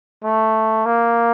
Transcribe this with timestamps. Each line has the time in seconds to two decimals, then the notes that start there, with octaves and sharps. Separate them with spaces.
0.24 A3
0.85 A#3